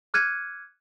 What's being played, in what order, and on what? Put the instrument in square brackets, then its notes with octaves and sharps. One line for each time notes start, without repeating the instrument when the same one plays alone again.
[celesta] D6 F6 F#6 G#6 C#7 D#7